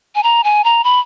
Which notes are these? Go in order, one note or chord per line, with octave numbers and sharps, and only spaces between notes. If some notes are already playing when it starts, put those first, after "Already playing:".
G#5
A#5
G#5
A#5
B5